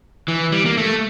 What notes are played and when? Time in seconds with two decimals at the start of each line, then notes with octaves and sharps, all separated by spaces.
0.28 E3
0.52 G3
0.66 A#3
0.77 A3